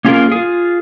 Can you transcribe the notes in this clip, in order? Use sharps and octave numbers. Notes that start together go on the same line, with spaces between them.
A#3 C#4 F4 G4 G#4 A#4
F4 G#4